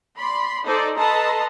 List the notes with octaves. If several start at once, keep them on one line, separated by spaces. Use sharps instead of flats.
D5 B5 C6
D#4 A4 C5 D5
A4 B4 D#5 A5 A#5 C6